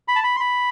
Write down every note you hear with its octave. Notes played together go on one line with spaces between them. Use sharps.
B5
A5
B5
C6
B5